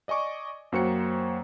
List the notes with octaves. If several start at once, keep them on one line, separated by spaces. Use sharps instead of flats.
D5 D#5 G#5 C#6 D6
F#2 A#3 F#4 C5 G5 C#7